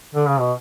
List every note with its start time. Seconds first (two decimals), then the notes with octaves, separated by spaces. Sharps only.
0.14 D3
0.28 C#3
0.40 B2